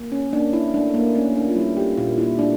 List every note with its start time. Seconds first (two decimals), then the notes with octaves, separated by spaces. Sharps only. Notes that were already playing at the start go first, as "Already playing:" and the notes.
Already playing: A#3
0.12 C#4
0.32 A#3 D4
0.53 E4
0.74 A3 D4
0.94 A#3
1.15 A3 C#4
1.35 D4
1.48 F4
1.56 G3 E4
1.77 G4
1.97 A#2 F4
2.18 E4
2.39 A3 D4